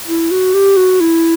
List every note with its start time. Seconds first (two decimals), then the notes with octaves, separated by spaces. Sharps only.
0.07 E4
0.31 F#4
0.54 G4
0.77 F#4
1.00 E4